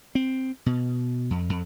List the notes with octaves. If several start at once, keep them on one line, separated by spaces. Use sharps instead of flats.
C4
B2
F2
F2